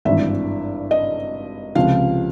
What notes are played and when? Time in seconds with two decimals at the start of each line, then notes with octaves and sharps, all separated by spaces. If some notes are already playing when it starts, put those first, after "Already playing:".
0.05 G#1 G2 E3 E5
0.91 D#5
1.75 C#2 C3 F3 F5